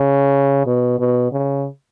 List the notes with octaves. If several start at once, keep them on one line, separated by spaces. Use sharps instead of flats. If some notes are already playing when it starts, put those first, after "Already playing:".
Already playing: C#3
B2
B2
C#3